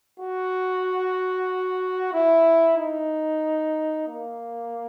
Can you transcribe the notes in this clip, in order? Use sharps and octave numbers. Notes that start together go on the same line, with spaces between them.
F#4
E4
D#4
A#3